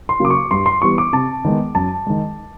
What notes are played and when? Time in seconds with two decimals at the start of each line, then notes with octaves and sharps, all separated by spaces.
0.09 C6
0.20 C#3 F#3 A#3 D6
0.30 C#6
0.51 G2 C6
0.66 C6
0.82 E3 G3 B3 C#6
0.98 D6
1.13 C3 A5
1.45 D#3 G#3 B3
1.75 F#2 A5
2.07 D#3 G#3